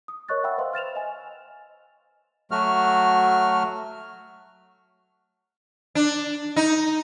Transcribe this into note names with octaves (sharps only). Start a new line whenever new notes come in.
D#6
A#4 C#5 D#5 C#6 F#6 A6
E5 F#5 G5 B5 E6
B4 C5 D#5 F5 C6
F6 A6 E7 F7
D#5 G#5
F#3 A3 F#4 F6
D4
D#4